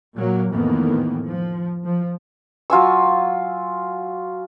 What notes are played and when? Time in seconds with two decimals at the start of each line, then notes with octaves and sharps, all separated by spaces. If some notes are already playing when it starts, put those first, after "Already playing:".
0.15 A#2 F#3 A#3
0.50 F2 A2 D#3 E3 A#3 B3
1.25 F3
1.84 F3
2.70 F#3 F4 G#5 E6